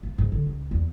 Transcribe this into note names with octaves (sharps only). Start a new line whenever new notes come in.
F4
G#2
D3
C#2
E2